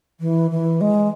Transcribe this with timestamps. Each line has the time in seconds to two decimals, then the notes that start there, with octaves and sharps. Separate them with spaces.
0.20 E3
0.51 E3
0.81 G#3